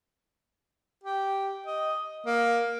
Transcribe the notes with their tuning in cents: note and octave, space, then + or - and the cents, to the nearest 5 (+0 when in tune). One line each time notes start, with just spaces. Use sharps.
G4 -5
D#5 +5
A#3 +10